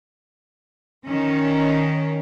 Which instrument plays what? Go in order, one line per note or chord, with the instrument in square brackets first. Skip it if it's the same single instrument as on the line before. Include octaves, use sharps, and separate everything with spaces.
[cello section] D#3 C#4